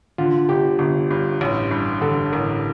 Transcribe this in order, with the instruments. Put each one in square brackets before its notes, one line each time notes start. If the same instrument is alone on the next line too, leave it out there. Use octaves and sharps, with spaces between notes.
[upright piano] D3 [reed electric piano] F4
[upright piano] G1 [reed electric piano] G4
[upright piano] G1
G2
A1
G2
[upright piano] D3 [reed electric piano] A4
[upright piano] A1 [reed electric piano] A#4